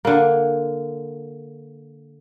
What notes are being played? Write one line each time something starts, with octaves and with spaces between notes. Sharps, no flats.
D3 A#3